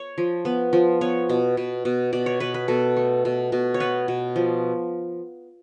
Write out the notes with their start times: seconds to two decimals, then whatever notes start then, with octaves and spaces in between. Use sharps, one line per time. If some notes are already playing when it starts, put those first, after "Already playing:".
Already playing: C#5
0.18 F3
0.45 B3
0.73 F3
1.01 B3 C#5
1.29 B2
1.57 B2
1.85 B2
2.13 B2 D5
2.26 C#5
2.40 B2 B4
2.54 B4
2.68 B2 A4
2.97 A3
3.25 B2
3.52 B2
3.74 C#5
3.80 B3 B4
4.08 B2
4.36 F3